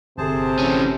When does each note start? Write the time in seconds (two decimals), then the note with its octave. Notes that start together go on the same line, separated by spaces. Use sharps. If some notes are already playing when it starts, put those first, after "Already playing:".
0.18 G1 C3 G#4 A4 C5 A5
0.59 E3 C#4